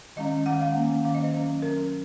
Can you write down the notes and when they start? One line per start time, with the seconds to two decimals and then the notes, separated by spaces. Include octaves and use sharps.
0.16 D#3 G#3 C#4 D#5
0.46 D#3 G#3 C#4 F#5
0.61 F5
0.75 D#3 A#3 C#4
1.05 D#3 A#3 C#4 F5
1.15 D#5
1.24 C5
1.34 F#3 C#4
1.62 F#3 C#4 A#4